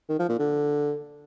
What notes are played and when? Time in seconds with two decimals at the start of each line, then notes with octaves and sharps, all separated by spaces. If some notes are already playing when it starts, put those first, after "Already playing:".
0.09 D#3
0.19 F3
0.29 A#2
0.39 D3